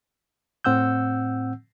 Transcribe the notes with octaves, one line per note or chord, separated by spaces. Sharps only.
A2 C4 F#5 E6 G6